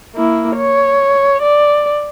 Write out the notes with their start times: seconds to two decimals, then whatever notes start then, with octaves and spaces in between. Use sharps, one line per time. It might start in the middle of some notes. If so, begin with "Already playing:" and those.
0.15 A#3 E4
0.57 C#5
1.43 D5